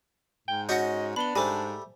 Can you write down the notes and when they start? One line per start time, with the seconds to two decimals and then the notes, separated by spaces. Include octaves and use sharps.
0.48 G#2 G5
0.69 C#4 F#4 C#5 D#5 F#5 G6
1.16 B3 D4 B5 G7
1.36 G#2 G3 A3 C5 G#5